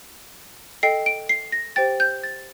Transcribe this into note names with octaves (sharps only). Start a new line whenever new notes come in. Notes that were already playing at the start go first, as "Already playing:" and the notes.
A4 D#5 G5 C7
D7
C7
A#6
G4 C5 G5 A6
G6
A6